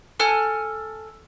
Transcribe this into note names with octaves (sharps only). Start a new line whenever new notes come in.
A4 G#5 F6 F#6